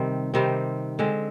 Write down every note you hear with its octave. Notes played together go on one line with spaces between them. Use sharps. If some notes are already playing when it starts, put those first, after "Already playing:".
Already playing: C3 D#3 G3 C4
C3 D#3 G3 C4
D3 G#3 C4